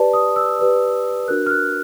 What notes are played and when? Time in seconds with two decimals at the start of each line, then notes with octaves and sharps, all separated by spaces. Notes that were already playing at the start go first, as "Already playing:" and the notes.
Already playing: G4 B4 D5 A5
0.13 D#6
0.36 E6
0.59 G4 B4 D5
1.27 D4 F#4 A#4 F#6
1.46 F6
1.51 F#6